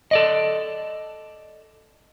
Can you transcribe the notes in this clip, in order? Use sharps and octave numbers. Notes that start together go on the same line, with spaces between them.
A4 D5 D#5